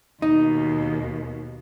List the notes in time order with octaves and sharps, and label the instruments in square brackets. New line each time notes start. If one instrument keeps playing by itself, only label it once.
[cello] D#2 B2 [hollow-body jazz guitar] D#4